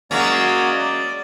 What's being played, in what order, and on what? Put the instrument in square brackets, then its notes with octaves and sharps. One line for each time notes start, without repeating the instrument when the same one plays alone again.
[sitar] F#3 G#3 C#4 [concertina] A#3 F#4 D5
[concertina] D5